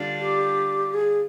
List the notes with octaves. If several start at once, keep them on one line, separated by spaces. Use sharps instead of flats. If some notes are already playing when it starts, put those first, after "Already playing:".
Already playing: D3 G3 D4 F4
G4
G#4